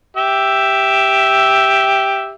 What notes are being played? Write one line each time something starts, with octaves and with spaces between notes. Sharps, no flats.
G4 E5